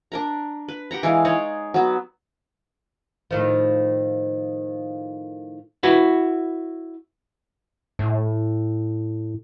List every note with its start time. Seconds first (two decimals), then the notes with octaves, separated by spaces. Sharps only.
0.12 D4 A#4 A#5
0.68 B4
0.91 G4 A#4 F#5 A#5
1.03 E3 G#3 F5
1.25 D#4 G#4 C#5 D5
1.74 F#3 B3
3.31 A2 D#3 F3
5.83 E4 F#4 B4
7.99 A2